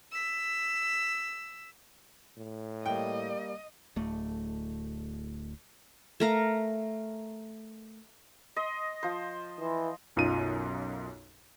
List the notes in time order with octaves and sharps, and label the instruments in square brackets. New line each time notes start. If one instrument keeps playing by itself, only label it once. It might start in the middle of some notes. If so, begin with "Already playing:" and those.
[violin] E6 B6
[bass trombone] A2
[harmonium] G3 A#3 [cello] D#5 [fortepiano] G5
[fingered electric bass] D1 A3
[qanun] A3 A#4 F5
[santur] D#5 C6
F3 C5
[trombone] E3
[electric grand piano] B1 F#2 D#4 F4 D#7